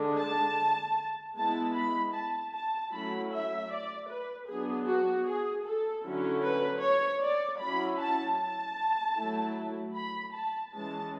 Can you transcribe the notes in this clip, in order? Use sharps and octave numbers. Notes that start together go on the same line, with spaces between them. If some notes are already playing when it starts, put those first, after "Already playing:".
Already playing: D3 G#3 D4
A5
G#3 B3 E4 A5
B5
A5
A5
F#3 A3 C#4 E4 B5
E5
D5
B4
F#3 B3 D4 G#4
F#4
G#4
A4
D3 F#3 C#4 E4
B4
C#5
D5
F#3 C#4 E4 B5
A5
A5
F#3 A3 E4
B5
A5
E3 G#3 C#4 A5